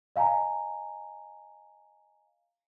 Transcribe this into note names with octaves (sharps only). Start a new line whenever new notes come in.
D#5 F5 G#5 A#5